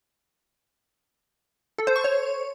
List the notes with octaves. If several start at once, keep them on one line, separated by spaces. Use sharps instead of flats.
A4
C5
C#6
C#5